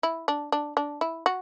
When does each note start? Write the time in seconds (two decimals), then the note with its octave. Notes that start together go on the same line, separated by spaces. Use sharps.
0.03 E4
0.28 D4
0.52 D4
0.77 D4
1.01 E4
1.26 F#4